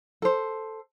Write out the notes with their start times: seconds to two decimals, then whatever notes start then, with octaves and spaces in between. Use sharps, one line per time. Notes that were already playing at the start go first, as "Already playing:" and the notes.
0.22 A4 C5